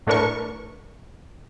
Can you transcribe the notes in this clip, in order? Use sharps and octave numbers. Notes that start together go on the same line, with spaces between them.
A2 A3 D4 A#4 B4 C#6